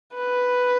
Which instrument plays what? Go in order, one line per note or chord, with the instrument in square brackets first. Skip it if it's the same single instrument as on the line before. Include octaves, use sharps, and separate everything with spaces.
[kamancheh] B4